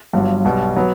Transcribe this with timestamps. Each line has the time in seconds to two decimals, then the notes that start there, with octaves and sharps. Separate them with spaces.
0.13 G1 G2 F#3
0.45 B1 B2 G3
0.76 F#3 B3